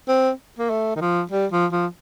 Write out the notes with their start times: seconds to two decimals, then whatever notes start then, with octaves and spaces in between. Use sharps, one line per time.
0.08 C4
0.59 A#3
0.70 A3
0.96 D#3
1.01 F3
1.32 G3
1.52 F3
1.72 F3